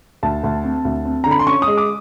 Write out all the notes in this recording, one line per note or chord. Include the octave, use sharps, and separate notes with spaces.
D2 A5
D2
C4
D2
C4
D3 A#5
B5
C6
C#4 C#6
D#6
G#3
D6